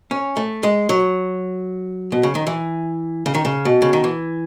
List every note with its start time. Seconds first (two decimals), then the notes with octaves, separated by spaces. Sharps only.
0.11 C#4
0.37 A3
0.63 G#3
0.89 F#3
2.12 B2
2.23 C#3
2.35 D#3
2.47 E3
3.26 C#3
3.34 D#3
3.45 C#3
3.65 B2
3.82 C#3
3.93 D#3
4.04 E3